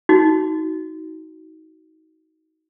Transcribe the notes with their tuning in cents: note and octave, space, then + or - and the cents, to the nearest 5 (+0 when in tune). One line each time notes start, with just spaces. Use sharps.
D#4 +25 F#4 +10